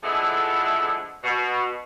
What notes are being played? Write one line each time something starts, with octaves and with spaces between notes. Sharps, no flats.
D3 F3 G#3 A3 B3 E4
B2